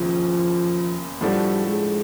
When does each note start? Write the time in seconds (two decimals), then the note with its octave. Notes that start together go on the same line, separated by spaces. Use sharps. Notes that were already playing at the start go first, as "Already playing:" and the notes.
Already playing: E1 D#2 C#3 F3
1.21 A2 F3 G3 A3 D4 F#4
1.67 G#3